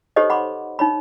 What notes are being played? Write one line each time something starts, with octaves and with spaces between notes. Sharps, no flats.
D#4 G4 A4 C5 C#5 D#5
F#5 B5 C6 D6
D#4 C#5 B5